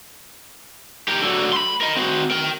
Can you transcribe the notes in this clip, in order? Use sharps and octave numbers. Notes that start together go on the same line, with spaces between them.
G4 A#4
D3 F#3
B5 C6
A#4 D#5
C4 F#4
A#4 G5